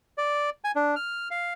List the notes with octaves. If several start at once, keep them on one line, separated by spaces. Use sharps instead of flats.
D5
G#5
D4
F6
F5